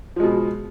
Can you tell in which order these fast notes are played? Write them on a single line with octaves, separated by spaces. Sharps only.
F3 G#3 B2